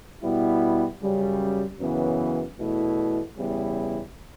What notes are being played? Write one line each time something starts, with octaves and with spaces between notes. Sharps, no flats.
B2 G3 B3 E4
F#2 C#3 G3
F#2 C#3 E3 B3
E2 B2 A3 E4
E2 C#3 G3 B3 E4